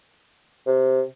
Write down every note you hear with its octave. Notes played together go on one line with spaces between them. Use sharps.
C3